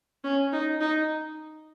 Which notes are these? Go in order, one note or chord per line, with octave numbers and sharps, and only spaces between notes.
C#4
D#4
D#4